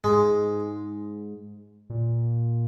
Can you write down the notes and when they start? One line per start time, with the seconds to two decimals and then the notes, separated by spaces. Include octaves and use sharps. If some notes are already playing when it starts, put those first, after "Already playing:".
0.04 G#2 G#3
1.90 A#2